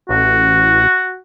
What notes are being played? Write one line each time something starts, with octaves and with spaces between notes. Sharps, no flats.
A1 F#4